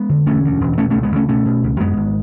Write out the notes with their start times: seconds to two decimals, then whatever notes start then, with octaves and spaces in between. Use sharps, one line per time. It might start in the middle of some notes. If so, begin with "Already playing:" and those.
Already playing: G#3 B3
0.09 D3
0.26 E1 A3 C#4
0.44 D2
0.61 E1
0.77 B2 A3 C#4
0.90 C#2 A3 C#4
1.03 G#3 B3
1.12 C#2 A3 C#4
1.28 B2 A3 C#4
1.46 B2
1.63 C#2
1.80 F#2 G#3 B3
1.97 G#1